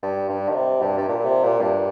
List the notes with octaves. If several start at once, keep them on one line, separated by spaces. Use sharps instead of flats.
G2
G2
D#3
C3
G2
G2
A#2
C3
A#2
G2